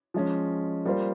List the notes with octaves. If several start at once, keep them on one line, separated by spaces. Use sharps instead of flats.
F3 G#3 C#4
G3 A#3 F4 C5